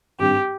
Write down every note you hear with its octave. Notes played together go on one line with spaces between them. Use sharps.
G#1 G2 G3 G4